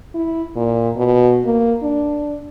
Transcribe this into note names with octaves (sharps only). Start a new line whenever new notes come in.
E4
A#2
B2
A#3
D4